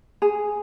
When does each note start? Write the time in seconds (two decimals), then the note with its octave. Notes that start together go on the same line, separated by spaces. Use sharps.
0.22 G#4